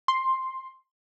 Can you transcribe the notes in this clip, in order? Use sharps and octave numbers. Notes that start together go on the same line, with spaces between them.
C6